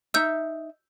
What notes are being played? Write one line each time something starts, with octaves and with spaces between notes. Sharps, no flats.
D#4 E5 E6 G6